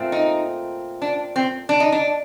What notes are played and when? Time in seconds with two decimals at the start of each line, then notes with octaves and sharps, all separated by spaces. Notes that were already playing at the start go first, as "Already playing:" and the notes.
Already playing: A#2 A3 C4
0.12 D#4
1.02 D4
1.36 C4
1.69 D4
1.80 D#4
1.92 D4